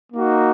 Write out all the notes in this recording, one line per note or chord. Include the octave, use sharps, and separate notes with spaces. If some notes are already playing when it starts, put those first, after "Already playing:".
A#3 D#4 F#4